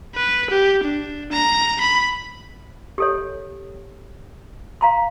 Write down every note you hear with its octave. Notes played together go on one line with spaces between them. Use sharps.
B4
G4
D4
A#5
B5
G4 A4 C#5
F5 A#5 C6